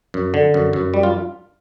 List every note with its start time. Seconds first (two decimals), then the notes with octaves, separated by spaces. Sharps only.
0.14 F#2
0.34 D3
0.54 F#2
0.73 F#2
0.94 G3
1.03 F4